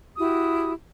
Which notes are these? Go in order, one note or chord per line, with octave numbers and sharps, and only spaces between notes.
E4 F#4 G4 D#6